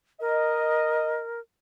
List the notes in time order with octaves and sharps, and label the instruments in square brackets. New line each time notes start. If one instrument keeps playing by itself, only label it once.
[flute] A#4 [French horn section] D#5